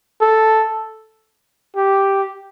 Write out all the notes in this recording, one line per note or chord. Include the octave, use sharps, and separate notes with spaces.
A4
G4